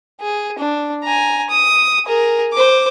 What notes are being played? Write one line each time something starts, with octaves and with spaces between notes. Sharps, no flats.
G#4
D4
G#5 A#5
D#6
G#4 A#4
C5 D6